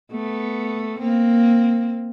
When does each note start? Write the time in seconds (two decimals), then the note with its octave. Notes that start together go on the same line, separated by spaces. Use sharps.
0.12 A3 B3
0.99 A#3 C4